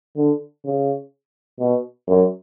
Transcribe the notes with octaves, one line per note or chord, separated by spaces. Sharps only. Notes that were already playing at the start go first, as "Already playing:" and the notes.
D3
C#3
B2
F#2